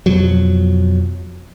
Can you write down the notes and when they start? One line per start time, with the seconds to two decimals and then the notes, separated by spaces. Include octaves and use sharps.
0.06 F2 B2 F3 F#3